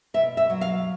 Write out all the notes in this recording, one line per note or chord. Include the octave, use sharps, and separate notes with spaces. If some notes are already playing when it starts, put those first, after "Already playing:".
B2 E5
E5
F#3
F5